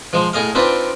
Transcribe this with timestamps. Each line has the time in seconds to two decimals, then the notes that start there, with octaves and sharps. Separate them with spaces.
0.13 F3 G#3 C5
0.33 A2 G#4 D#5 F5
0.55 C4 D4 D#4 F4 B4